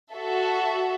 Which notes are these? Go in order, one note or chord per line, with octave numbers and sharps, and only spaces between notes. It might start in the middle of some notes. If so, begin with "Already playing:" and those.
F#4 A4 E5